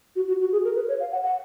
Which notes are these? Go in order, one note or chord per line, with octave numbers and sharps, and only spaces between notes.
F#4
F#4
F#4
G#4
A#4
B4
C#5
F5
F#5
F#5